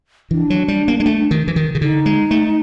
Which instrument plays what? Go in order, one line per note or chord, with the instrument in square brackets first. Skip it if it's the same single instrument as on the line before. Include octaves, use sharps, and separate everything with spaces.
[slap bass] E3 [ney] D4
[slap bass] F#3
G3
A#3
G#3
A3
D#3
E3
D#3
C#3
[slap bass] D3 [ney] D#4
[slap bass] G#3
A3